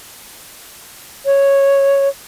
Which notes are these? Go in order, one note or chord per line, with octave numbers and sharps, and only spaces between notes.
C#5